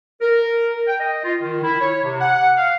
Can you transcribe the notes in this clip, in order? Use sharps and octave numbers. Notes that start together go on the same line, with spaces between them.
A#4
G5
D#5
F4
D#3
E4
C#5
C3
F#5
F5